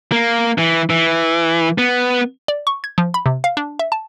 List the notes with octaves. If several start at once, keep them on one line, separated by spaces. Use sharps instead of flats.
A#3
E3
E3
B3
D5
C#6
G#6
F3
B5
C3
F5
D4
E5
A5